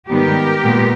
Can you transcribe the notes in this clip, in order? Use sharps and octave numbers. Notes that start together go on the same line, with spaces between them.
G#2 D#3 G3 B3 G4 A#4
A#2 G#3 B3